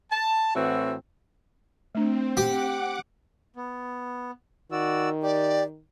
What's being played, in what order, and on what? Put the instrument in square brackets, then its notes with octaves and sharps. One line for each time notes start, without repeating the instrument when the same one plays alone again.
[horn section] A5
A2 E3 C4 F#4
[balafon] A3 D4 [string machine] C4
[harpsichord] G4 [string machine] F#5 D6
[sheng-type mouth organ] B3
[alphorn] D#3 [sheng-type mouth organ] F#4 D5 E6
[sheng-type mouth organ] G4 [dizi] D5